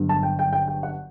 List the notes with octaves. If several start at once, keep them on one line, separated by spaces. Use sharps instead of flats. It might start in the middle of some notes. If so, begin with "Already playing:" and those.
Already playing: G1 G2 D3 F#3
A5
G5
G5
G5
G5
F#5